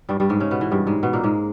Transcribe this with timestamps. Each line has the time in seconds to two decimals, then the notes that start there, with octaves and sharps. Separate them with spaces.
0.09 G2 G3
0.20 G2 G3
0.29 G#2 G#3
0.40 C#3 C#4
0.51 B2 B3
0.61 E3
0.71 G2 G3
0.87 G#2 G#3
1.03 B2 B3
1.13 A#2 A#3
1.24 G#2 G#3